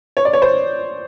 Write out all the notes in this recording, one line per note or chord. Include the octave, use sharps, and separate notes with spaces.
C#5
D5
C#5
C5